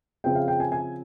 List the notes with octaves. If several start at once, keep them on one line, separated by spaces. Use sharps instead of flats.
C#3 F3 C4 G5
F5
G5
G#5
G#5